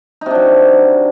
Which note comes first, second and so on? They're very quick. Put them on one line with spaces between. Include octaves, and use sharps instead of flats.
D#4 C3 D4 F#3